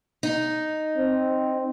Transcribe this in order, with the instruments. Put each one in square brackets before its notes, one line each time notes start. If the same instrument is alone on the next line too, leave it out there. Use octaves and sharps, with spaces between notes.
[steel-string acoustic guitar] D#4
[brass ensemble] C4